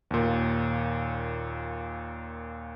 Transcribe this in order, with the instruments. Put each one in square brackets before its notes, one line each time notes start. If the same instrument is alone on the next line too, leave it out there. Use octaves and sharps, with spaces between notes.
[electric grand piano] D#2 A#2